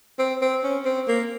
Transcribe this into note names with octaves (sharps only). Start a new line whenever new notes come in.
C4
C4
C#4
C4
A#3